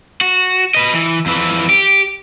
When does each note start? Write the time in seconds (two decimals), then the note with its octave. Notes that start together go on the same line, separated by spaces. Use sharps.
0.21 F#4
0.75 B4 D#5
0.94 E3
1.26 F2 E3
1.70 G4